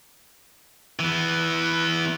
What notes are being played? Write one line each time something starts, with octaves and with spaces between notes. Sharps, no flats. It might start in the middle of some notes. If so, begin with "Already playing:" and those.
E3 B3